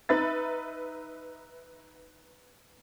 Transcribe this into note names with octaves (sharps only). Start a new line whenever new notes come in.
D#4 B4 E5 A6